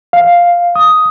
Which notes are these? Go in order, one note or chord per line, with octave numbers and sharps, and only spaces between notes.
F5
D#6